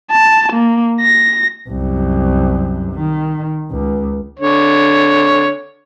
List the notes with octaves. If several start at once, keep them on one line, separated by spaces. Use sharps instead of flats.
A5
A#3
A#6
C2 F#2
D#3
C#2
D3 C#5